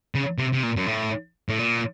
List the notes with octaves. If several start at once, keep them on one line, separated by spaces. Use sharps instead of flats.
C#3
C3
C3
A#2
F#2
A2
A2
A#2